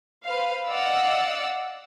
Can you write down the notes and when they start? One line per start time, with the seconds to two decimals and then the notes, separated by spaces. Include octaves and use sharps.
0.25 B4 C5 F5
0.68 D5 D#5 F5 F#5 E6